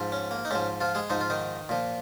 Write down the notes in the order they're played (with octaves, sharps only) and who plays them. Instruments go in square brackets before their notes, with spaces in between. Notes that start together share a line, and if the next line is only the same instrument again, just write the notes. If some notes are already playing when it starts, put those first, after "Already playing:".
Already playing: [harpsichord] G#2 F3
C#4
A#3
D#4
G#2 F3 C#4
F3 F4
G#3 G#4
G#2 F3 D#4
F4
D#3 D#4
A#2 F3